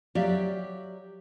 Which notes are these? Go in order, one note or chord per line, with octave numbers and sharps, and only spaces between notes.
F#3 G4 D5 E5 F5